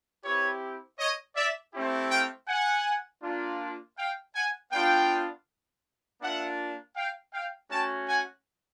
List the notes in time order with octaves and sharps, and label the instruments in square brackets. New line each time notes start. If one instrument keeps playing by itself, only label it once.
[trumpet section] C4 E4 G4 B4 C#5
C#5 D#5
D5 E5
A3 C4 E4 G4
F5 G5
F#5 G#5
A#3 D4 F4
F5 G5
F#5 G#5
B3 D4 F4 F5 G5
A#3 D4 F4 E5 F#5
F5 G5
F5 G5
A3 C#4 F#4 G5 A5
F#5 G#5